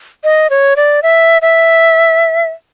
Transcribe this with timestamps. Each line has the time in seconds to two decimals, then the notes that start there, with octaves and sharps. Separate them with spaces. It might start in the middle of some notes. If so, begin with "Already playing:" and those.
0.24 D#5
0.50 C#5
0.76 D5
1.03 E5
1.42 E5